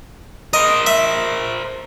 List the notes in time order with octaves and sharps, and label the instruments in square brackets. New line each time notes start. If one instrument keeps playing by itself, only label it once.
[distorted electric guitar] A#4 C5 [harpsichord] D#5
[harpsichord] E5